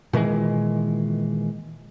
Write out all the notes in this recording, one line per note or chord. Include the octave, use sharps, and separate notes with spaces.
A#2 D#3 E3 G#3